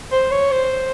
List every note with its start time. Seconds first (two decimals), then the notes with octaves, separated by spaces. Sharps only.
0.12 C5
0.31 C#5
0.51 C5